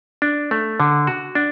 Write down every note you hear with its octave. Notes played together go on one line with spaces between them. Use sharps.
D4
A3
D3
F#4
D4